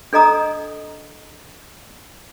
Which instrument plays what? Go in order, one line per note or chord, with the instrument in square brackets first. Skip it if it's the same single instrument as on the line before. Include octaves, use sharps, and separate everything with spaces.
[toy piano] D4 A4 D#5 A#5 D#6